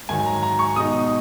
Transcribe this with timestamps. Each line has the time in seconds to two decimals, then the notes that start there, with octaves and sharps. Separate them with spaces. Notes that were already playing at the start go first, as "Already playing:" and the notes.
0.09 G#2 D#3 F#3 G#5
0.26 A#5
0.43 A#5
0.59 C#6
0.76 B2 G#3 D#4 D#6